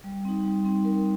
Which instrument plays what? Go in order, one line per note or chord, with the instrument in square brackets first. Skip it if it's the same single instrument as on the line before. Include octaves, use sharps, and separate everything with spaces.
[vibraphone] G3
C4 D#4
G3
C4 D#4
G3 A#4